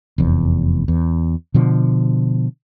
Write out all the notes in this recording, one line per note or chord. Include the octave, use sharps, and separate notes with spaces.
F1 E2
E2
B2 D3 F3